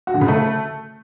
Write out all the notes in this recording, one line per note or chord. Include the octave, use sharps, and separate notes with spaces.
F#4
D3
C#3
A3